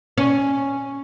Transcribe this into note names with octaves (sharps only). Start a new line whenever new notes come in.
C#4